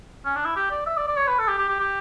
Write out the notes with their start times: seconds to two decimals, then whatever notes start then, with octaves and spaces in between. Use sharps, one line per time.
0.25 C#4
0.36 D4
0.45 E4
0.56 G4
0.71 D5
0.86 E5
0.97 D5
1.07 D5
1.17 C#5
1.27 B4
1.39 A4
1.48 G4
1.58 G4
1.69 G4
1.80 G4